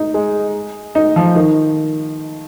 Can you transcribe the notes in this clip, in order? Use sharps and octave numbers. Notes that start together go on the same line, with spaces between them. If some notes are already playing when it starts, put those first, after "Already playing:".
Already playing: D#4
G#3
D#4
F3
D#3